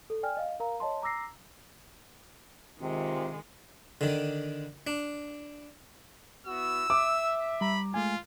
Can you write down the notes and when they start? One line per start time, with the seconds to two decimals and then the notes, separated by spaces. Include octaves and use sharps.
0.10 A4
0.23 D5 G5 G#5 F6
0.37 D#5 F5
0.60 A#4 F5 A#5
0.80 C#5 D#5 A5 C6
1.02 A#5 D6 E6 A#6 C7
2.80 C3 D#3 G#3 F4
4.01 D3 D#3
4.87 D4
6.47 B3 E4 F#4 E6
6.90 E5 D6
7.61 G3 A#5 B5
7.94 G#3 A3 F4 G#5